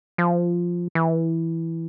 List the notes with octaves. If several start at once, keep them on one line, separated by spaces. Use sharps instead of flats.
F3
E3